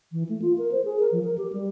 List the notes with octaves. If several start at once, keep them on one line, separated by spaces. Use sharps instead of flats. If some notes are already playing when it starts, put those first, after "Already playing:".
E3
A3
F4
A#4
C5
G#4
A#4
F3
A#4
G4
G3